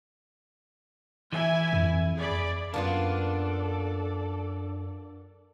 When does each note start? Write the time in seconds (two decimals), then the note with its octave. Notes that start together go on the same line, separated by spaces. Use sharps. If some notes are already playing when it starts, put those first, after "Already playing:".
1.33 E3 E4 G#5
1.73 F2
2.17 G#4 D5 B5
2.74 F#2 A#3 B3 D4 F4 A4 D5 A5